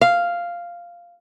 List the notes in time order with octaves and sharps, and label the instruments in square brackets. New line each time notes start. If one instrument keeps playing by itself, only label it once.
[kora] F5